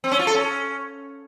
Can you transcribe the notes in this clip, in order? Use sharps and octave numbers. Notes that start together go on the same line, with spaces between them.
C4
C#4
F4
A4
C#4